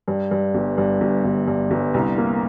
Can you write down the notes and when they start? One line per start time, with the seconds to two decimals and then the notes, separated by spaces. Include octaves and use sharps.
0.08 G2
0.31 G2
0.54 G1
0.78 G2
1.01 G1
1.24 G1
1.47 G2
1.71 G1
1.94 C2
2.17 A#3